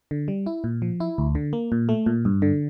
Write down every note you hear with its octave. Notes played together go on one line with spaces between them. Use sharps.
D3
G3
E4
A#2
F3
E4
D2
D3
A#3
A#2
A3
A#2
G2
D3